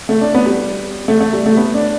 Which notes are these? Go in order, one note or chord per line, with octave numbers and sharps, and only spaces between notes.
A3
D4
B3
G3
A3
A3
G3
A3
B3
D4